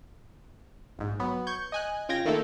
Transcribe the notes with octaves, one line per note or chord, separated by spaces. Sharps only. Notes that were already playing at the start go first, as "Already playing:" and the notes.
A#1 G#2
F#3 B3
C#6 G6 G#6
D#5 G#5 F#6
C#3 F4 G5 G#6 A#6
D#3 A3 A#3 D#4 E4 A4